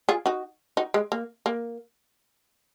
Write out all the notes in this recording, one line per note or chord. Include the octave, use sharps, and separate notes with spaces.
F4 G#4
D#4 F#4
D#4 F#4
G#3
A#3
A#3